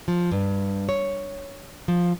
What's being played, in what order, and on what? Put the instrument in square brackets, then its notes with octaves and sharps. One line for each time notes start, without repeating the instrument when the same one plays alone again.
[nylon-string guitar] F3
G2
C#5
F3